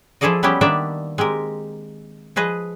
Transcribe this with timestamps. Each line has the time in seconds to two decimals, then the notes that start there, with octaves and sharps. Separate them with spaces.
0.21 F3 E4 G#4 A4 D5 D#5
0.43 G3 B3 C#4 E4 G4
0.61 D#3 A#3 B3 D4 D5 E5
1.18 G#3 C4 G4 A#4
2.36 F3 G#4 B4 D#5